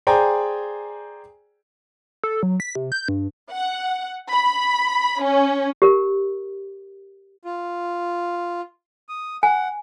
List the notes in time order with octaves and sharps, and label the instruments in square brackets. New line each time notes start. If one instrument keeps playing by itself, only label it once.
[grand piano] G#4 C5 D5 G5 G#5 A#5
[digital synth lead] A4
F#3
B6
C3
G6
G2
[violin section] F#5
B5
C#4
[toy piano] G4 A#4
[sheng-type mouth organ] F4
D#6
[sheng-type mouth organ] F#5 [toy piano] G#5